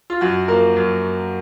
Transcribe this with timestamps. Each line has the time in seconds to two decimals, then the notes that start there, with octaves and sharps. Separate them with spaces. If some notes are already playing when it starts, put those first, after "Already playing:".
0.10 F4
0.21 F#2 F#4
0.48 F3 A#3 A#4
0.76 F#2